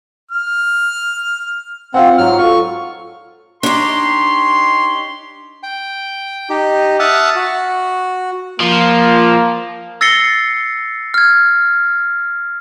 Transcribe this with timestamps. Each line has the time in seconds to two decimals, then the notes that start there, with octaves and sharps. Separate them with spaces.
0.31 F6
1.94 C4 F4 F5 F#5
2.18 G#2 F#3 F6
2.38 F4 A4 C#6
3.63 D4 D#4 G4 C#5 C6
5.63 G5
6.50 D#4 G4
6.99 E5 F#5 A5 D#6 F6
7.36 F#4
8.60 F3 A#3
10.01 E6 A6 A#6 C7 C#7 G7
11.14 F6 G#6